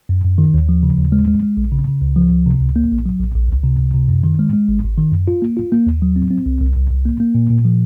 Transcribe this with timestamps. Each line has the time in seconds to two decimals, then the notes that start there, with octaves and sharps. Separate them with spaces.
0.09 F#2
0.24 F#2
0.38 D#3
0.54 D#2
0.69 F3
0.83 C#3
0.98 D#2
1.12 G#3
1.28 G#3
1.42 G#3
1.57 A#1
1.72 C#3
1.87 C#3
2.02 C#2
2.16 F3
2.31 C#2
2.46 C3
2.61 C#2
2.76 A#3
2.91 A#1
3.06 F#3
3.20 A#1
3.34 A#1
3.49 C#2
3.64 C3
3.79 C#2
3.94 C3
4.09 F#2
4.24 D#3
4.39 G#3
4.53 G#3
4.69 G#1
4.83 G#1
4.97 D#3
5.12 F#2
5.28 F4
5.42 A#3
5.57 F4
5.72 A#3
5.86 D#2
6.02 F#3
6.16 C4
6.31 C4
6.46 C2
6.61 C2
6.76 C2
6.90 C2
7.05 A#3
7.20 A#3
7.35 A#2
7.50 A#2
7.65 F3